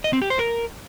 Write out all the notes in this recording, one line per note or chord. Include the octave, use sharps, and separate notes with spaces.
D#5
C4
G4
C5
A#4